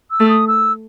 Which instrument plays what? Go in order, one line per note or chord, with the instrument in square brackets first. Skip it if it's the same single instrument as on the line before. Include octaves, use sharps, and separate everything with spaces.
[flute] E6
[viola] A3
[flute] D#6
E6